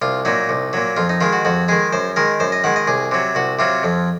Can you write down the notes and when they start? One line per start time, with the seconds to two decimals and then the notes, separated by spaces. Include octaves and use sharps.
0.02 C2 F4
0.25 A#2 F#3 D#4
0.49 C2
0.73 A#2 F#3
0.97 F2 F4
1.09 D#4
1.21 D#3 G#3 F4
1.33 F#4
1.45 F2 F#4
1.68 D#3 G#3 G#4
1.93 F#2 C5
2.16 D#3 G#3 A#4
2.40 F#2 C5
2.52 D#5
2.64 D#3 G#3 F#5
2.76 D#5
2.87 C2 G#4
3.11 C3 F#3
3.35 C2 F#4
3.59 C3 F#3 F4
3.83 F2